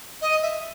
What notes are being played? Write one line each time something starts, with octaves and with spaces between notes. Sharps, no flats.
D#5
E5